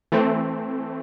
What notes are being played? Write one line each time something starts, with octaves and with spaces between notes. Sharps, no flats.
E3 A3 C4